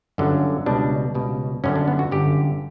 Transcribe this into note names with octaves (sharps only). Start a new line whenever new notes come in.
G1 F#2 D3 F#3
C#2 B2 G3 D4
C#2 B2 G3
G1 F#2 D3 C#4
D4
B3
F#4
G1 F#2 D3 G4